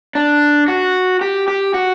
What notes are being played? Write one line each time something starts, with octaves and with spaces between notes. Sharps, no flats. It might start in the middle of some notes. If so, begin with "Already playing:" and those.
D4
F#4
G4
G4
F#4